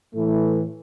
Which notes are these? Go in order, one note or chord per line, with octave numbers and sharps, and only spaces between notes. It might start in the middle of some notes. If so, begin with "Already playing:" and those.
A2 E3 A3